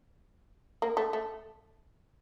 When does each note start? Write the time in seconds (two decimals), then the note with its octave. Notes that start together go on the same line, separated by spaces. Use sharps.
0.82 A#3
0.97 A3
1.13 A3